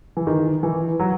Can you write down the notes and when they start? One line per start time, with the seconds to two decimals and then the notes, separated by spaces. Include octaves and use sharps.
0.17 E3
0.27 D#3
0.63 E3
1.00 F#3